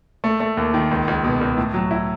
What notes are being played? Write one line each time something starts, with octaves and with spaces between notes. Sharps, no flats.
A3
A3
D#2
D#3
C#2
C#2
B2
C#2
A2
F#3
E4